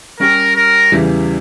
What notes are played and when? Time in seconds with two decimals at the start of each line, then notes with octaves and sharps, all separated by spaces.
0.20 G3 C#4 G4 A#4
0.55 A#4
0.92 E2 C#3 E3 G3